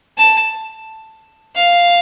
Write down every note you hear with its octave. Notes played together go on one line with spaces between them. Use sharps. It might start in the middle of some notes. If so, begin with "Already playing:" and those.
A5
F5